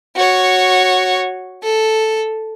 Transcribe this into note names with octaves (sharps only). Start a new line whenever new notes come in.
F#4 C#5
A4